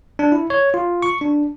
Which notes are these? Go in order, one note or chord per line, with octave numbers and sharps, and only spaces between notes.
D4
E4
C#5
F4
C#6
D4